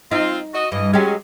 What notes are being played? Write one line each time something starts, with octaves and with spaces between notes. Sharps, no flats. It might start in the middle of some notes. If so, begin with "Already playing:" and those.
C4 D#4 F4
F#4 D#5
G2 E3 D#5
F#3 G#3 C#4 G4